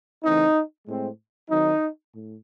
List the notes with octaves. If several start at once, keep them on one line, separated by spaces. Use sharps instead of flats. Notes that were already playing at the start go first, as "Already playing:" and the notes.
C#3 E3 A3 C4 D#4
A2 G#3 C4
D#3 F#3 C4 D#4
A2